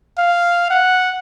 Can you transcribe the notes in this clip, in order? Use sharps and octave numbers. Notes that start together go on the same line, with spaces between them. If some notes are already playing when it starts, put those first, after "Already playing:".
F5
F#5